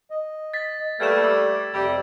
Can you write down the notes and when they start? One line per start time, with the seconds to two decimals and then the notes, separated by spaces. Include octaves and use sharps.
0.10 D#5
0.54 A6 B6
1.00 G3 A3 A#3 B4 F6 G#6 E7
1.24 D6 E6
1.73 F2 C3 G3